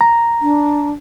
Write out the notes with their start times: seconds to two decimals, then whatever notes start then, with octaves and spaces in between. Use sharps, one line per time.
0.01 A#5
0.42 D4